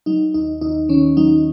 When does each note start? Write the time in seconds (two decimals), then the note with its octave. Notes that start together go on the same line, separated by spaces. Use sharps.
0.06 F#3 D#4
0.34 D#2 D#4
0.61 D#2 D#4
0.89 D#3 C#4
1.17 F#3 D#4